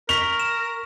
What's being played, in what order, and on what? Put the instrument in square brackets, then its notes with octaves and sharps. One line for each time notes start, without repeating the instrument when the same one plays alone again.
[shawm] A#4 [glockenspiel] C#6 B6 [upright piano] F7
[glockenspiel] E7